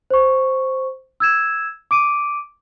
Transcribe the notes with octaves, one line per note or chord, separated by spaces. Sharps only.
C5 C#6
E6 G#6 E7
D6 D7 D#7